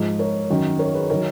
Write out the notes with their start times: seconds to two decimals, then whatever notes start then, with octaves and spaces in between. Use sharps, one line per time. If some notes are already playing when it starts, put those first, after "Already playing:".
Already playing: G#2 F3
0.19 A#4 C#5
0.50 F#2 D#3 F#3
0.79 A#4 C#5
0.94 G#4 B4
1.10 D#3 F#3 A#4 C#5